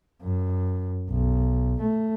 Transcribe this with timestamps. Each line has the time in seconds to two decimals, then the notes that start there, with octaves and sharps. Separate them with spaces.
0.22 F#2
1.10 B1
1.80 A3